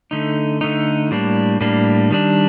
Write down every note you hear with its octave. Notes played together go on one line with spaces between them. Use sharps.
D3 A3 D#4
D3 A3 D#4
A2 G3 A#3 D4
A2 G3 A#3 D4
D#3 G3 D4